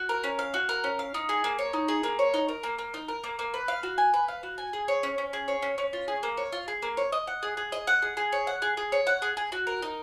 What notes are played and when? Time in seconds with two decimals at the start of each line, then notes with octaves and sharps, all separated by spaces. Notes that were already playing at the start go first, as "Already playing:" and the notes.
Already playing: F#4
0.09 A#4
0.24 C#4
0.39 F5
0.54 F#4
0.69 A#4
0.84 C#4
0.99 F5
1.14 D#4
1.29 G#4
1.44 A#3
1.59 C#5
1.73 D#4
1.88 G#4
2.03 A#3
2.19 C#5
2.34 D#4
2.48 A#4
2.63 A#3
2.79 A#3
2.94 D#4
3.08 A#4
3.24 A#3
3.39 A#3
3.54 B4
3.68 F5
3.83 F#4
3.98 G#5
4.14 B4
4.28 F5
4.43 F#4
4.58 G#5
4.73 G#4
4.88 C#5
5.03 C#4
5.18 C#4
5.33 G#4
5.48 C#5
5.62 C#4
5.78 C#4
5.93 F4
6.08 G#4
6.23 A#3
6.37 C#5
6.52 F4
6.68 G#4
6.82 A#3
6.97 C#5
7.12 D#5
7.27 F#5
7.43 G#4
7.57 G#4
7.72 D#5
7.87 F#5
8.02 G#4
8.17 G#4
8.32 C#5
8.47 F#5
8.62 G#4
8.77 G#4
8.92 C#5
9.07 F#5
9.22 G#4
9.37 G#4
9.52 F#4
9.67 A#4
9.82 D#4